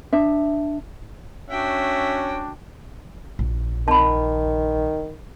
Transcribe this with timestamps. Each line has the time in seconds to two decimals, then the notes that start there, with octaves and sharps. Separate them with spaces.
0.13 D4 E5
1.50 C#4 D4 F#4 E5 G5
3.39 A#1
3.88 D#3 A5 B5